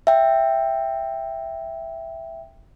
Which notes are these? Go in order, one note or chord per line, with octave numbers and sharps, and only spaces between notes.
E5 G5